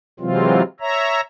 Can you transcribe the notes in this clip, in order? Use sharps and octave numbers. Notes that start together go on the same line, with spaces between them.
C3 E3 F#3 G#3 C4 F4
C#5 E5 A#5